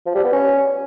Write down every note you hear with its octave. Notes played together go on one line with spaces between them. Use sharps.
F3
G3
B3
C#4